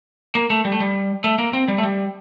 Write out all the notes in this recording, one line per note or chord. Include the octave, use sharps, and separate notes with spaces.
A#3
A3
G3
A3
G3
A3
A#3
C4
G3
A3
G3